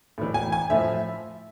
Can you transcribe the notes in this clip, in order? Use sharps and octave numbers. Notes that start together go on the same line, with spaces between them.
A2 E3
G#5
G#5
A2 F3 E5